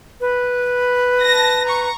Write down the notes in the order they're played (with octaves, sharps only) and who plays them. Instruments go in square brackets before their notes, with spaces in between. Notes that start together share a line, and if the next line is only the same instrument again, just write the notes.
[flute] B4
[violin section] A5 A#6
A#5 C#6